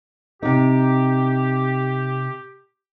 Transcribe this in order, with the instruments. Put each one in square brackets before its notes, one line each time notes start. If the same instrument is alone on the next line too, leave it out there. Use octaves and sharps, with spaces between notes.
[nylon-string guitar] C3 D#4 [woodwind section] G4